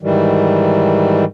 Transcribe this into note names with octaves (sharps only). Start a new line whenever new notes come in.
G#2 D#3 E3 G3